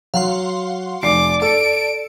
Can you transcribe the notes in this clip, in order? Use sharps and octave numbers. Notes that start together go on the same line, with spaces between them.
F#3 F5 F#5 C6
F1 D5 G#5 D6 C7
A4 A5 E6 C#7 D7